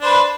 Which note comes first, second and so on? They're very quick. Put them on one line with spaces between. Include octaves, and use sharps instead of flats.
D4 C5 B4